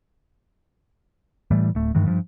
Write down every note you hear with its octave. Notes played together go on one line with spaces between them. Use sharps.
A2 E3 G3 A3
D1 A3
G2 D#3 E3 G#3
G2 F3